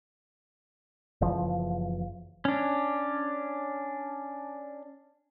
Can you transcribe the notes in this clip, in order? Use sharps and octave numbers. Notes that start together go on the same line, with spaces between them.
F#1 C#3 E3 F3
C#4 D4